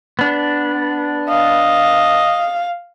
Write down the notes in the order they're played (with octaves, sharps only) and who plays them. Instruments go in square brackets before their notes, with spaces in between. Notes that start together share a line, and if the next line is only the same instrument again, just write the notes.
[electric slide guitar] B3 D4
[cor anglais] D#5 [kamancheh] F5